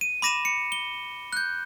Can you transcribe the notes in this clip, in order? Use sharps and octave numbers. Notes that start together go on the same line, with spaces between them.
D#7
B5 D6 A#6 D#7 E7
C#7
G7
F#6 G6